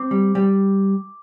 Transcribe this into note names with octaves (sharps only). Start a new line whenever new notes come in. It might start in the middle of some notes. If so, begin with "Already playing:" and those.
Already playing: C4 D6
G3
G3